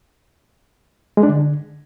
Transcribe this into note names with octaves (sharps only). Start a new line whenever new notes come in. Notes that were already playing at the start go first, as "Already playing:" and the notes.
G#3
D4
D3